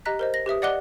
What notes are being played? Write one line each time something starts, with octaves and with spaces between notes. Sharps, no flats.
G4 D#5 A#5 F#6 B6
A#4 C5 D#5
A#6
G4 B4 E5 D#6
D5 D#5 F#5 D6 F#6 G7